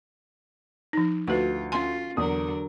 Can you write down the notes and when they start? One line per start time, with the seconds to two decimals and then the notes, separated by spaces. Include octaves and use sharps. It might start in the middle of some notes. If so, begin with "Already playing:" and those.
0.93 F3 D#4
1.27 D2 F4 F#4 B4
1.72 C#4 F4 G#5 C6
2.17 E2 D3 F#3 A#4 D#6